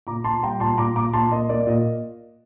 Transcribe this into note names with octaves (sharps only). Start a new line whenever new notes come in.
A#2 A#5 D6
A#2 A5 C6
G3 G5 A#5
A#2 A5 C6
A#2 A#5 D6
A#2 A#5 D6
A#2 A5 C6
A#3 D#5
A#3 D5
A#2 D#5